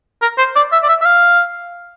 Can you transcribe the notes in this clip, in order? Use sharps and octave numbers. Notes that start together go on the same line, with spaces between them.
A#4
C5
D5
E5
D5
E5
E5
F5